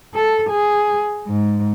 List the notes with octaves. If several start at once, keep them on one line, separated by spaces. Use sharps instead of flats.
A4
G#4
G#2